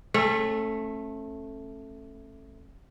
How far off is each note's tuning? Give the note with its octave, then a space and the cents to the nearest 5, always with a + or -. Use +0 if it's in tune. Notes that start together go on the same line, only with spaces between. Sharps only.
A3 +0 C#4 -35